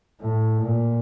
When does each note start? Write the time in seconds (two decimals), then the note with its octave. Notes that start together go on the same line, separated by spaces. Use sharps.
0.21 A2
0.63 A#2